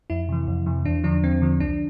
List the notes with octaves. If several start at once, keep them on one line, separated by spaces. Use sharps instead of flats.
F2 E4
C3 E3
F2
C3 E3
E2 D4
D3 F3 D4
E2 C4
D3 F3
C2 D4